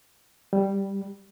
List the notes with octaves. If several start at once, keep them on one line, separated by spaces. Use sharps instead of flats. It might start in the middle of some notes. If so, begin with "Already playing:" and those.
G3